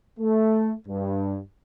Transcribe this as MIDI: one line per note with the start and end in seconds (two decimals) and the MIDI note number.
0.20 0.72 57
0.87 1.39 43